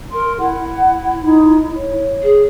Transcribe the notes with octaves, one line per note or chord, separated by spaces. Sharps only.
A#4 C6
E4 F#5
D#4
C#5
G#4